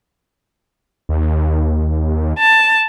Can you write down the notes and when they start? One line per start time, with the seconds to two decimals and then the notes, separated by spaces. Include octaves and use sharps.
1.09 D#2
2.38 A5